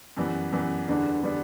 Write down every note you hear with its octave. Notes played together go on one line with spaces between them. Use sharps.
F#2 E3 G3 B3
F#2 E3 G3 B3
E2 D3 G3 B3 D4
D3 G3 B3 D4